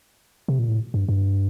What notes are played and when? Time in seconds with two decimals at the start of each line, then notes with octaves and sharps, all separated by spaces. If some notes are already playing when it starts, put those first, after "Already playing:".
0.48 C3
0.59 A#2
0.69 A2
0.94 G2
1.09 G2